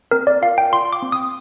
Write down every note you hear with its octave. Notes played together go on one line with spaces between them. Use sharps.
C4 A#4
D5
F4 F5
G5
F4 C6
D6
C4
D#6